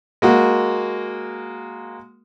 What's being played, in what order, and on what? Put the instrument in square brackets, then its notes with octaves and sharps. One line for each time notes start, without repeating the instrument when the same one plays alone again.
[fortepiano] G#3 A#3 F#4